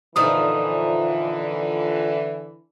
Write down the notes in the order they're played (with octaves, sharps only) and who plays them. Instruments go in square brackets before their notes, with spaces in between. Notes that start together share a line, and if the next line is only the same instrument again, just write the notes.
[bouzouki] A#2 F3 D#4 [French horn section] D3 E3 [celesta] D#6